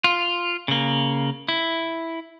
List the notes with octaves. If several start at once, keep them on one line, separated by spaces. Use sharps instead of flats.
F4
C#3 A#3
E4